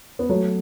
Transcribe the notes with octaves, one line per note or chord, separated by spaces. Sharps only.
B3
F#3 A3